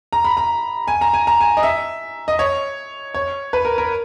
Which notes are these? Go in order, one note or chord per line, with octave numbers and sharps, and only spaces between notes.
A#5
B5
A#5
G#5
A#5
G#5
A#5
G#5
D#5
E5
D#5
C#5
C#5
B4
A#4
A#4